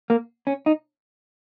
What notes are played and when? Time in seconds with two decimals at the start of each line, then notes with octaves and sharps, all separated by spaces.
0.10 A#3
0.47 C#4
0.66 D#4